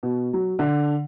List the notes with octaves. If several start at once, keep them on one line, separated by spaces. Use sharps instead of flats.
B2
F#3
D3